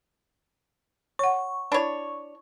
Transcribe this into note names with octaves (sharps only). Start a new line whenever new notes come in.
C#5 F#5 C#6
D4 E4 C#5 B5